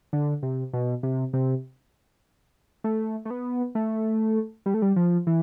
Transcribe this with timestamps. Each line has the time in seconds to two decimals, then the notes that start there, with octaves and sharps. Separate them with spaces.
0.13 D3
0.43 C3
0.73 B2
1.03 C3
1.33 C3
2.84 A3
3.25 A3
3.30 B3
3.75 A3
4.66 G3
4.74 A3
4.82 G3
4.96 F3
5.27 E3